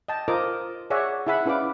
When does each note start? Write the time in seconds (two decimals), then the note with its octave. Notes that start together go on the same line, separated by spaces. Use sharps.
0.08 D#5 G5 A5
0.28 F4 A#4 C5 D#5 D6
0.90 G#4 C#5 D5 E5 F#5
1.27 E4 G#4 E5 F#5 B5
1.46 C#4 E4 B4 D5 F5 D6